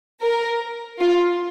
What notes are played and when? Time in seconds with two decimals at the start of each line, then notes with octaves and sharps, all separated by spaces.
0.22 A#4
0.99 F4